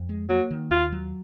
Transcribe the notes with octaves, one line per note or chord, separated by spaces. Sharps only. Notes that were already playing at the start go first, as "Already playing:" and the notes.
Already playing: F2
G#3
F#3 A#3
D#3
D#2 F4
F#3